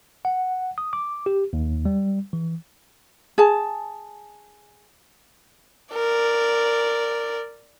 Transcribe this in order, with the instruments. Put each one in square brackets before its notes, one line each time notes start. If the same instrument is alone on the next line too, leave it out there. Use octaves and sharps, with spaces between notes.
[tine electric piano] F#5
D#6
D6
G4
D#2
G3
E3
[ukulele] G#4 A5
[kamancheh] A#4 D5